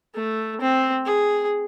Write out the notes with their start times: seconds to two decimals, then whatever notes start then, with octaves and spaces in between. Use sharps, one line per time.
0.15 A3
0.61 C4
1.05 G#4